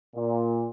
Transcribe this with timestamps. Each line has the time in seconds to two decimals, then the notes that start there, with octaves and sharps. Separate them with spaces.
0.16 A#2